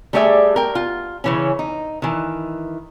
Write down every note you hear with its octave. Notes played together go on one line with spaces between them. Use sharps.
G3 A3 G4 G#4 D5 E5
A#4 G5
F4
C#3 E3 C#4
D#4
D#3 E3